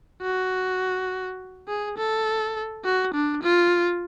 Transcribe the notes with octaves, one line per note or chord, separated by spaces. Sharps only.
F#4
G#4
A4
F#4
D4
F4